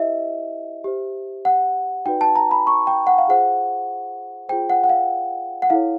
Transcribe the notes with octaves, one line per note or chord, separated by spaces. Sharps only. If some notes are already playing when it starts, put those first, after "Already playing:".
Already playing: E4 G4 C5 D#5 E5
G4 C5
F#5
D#4 F#4 B4 D5 G5
A5
A#5
B5
C#6
G5
F#5
F5
F4 G#4 C5 F#5
F4 G#4 C5 G5
F#5
F#5
F5
F#5
E4 A4 C#5 F5